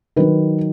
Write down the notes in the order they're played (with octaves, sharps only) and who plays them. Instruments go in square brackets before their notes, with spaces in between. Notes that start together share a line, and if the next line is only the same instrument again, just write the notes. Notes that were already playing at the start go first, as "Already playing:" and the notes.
[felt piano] D#3 F#3 D#4 B4